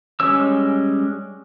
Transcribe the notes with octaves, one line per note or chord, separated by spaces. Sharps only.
G3 G#3 C#4 C#5 E6